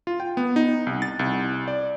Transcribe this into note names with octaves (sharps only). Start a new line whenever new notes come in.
F4
G5
B3
D#4
C2
A6
C2
D5